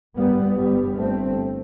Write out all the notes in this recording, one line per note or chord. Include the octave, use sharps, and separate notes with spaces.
G1 G2 G3 B3
G3 B3
A3 C4